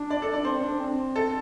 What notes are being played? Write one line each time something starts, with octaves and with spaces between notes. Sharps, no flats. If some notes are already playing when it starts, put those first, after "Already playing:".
Already playing: D4
D5
A4
D5
C4 C5
D4
C4
A4